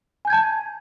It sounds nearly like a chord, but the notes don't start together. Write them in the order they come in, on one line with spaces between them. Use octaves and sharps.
G#5 G6 G#6 A5